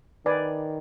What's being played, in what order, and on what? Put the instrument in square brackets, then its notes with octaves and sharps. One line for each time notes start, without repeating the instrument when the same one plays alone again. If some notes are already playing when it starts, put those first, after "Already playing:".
[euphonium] D#3 [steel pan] B4 D5 G#5